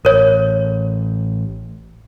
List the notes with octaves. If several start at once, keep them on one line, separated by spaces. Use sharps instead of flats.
A1 A#4 C#5